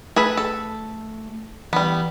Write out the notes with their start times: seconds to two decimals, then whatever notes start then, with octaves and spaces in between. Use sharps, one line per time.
0.16 A3 G#4 A4 B4
0.37 A4
1.73 E3 G3 B3